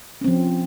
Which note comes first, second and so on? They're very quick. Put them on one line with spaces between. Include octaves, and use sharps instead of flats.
C#4 C4 F3